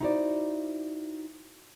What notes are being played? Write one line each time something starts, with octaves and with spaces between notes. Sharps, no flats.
D#4 E4 F#4 A#4 C5 D5